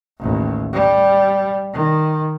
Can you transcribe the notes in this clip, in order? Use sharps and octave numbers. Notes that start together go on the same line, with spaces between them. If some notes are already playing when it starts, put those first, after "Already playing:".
A1 D#2
G3
D#3